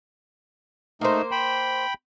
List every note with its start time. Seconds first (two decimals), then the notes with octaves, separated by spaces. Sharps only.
1.01 A3 A#3 D#4 A#4 C5
1.31 G5 B5